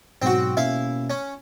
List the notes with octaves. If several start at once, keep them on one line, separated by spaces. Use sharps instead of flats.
G#2 B2 F#3 C4 F#4
B2 A#3 C#4 E4 F5
C#4